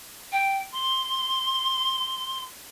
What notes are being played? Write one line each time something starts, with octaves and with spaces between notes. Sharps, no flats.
G5
C6